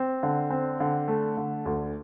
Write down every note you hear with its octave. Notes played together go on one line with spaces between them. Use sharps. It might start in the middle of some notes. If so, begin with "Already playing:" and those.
Already playing: C4
D3
C4
D3
A3
D3
D2